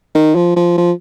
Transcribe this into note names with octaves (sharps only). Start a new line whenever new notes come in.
D#3
F3
F3
F3